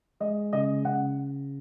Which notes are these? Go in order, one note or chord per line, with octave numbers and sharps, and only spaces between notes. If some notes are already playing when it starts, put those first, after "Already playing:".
G#3 D#5
C#3 D#5
C#3 F#5